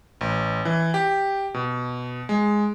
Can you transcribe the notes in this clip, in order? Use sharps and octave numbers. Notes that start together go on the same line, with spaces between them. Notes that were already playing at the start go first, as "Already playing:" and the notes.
A1
E3
G4
B2
G#3